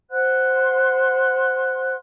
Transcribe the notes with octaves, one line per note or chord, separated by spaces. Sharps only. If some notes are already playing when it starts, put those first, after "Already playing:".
C5 F#5 C6 F#6